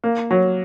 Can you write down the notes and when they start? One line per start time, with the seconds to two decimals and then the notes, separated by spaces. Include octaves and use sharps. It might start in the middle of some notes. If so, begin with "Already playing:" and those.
0.04 A#3
0.31 F#3